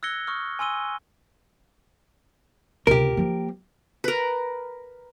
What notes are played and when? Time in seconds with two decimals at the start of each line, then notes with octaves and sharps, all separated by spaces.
0.03 E6 F#6 G#6 A#6 C#7 G7
0.27 C#6 D#6 F6
0.59 G#5 C6 E6 D#7 G7
2.87 C#2 C3 G4 A#4
3.17 F3 A#3
4.04 A#4 B4